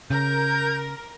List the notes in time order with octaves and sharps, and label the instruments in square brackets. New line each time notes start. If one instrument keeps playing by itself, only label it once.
[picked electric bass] C#3 [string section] A#4 [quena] G6